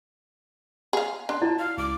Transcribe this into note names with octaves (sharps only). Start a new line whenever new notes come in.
G#4 F5
D4 C6
E4 F#4 D5 A5
F5
C#2 D6